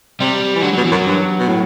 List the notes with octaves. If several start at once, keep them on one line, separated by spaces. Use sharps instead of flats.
C3 G3
E3
D3 F#3
B2 F#3
E3
F#2
F#3
G2
B2
A2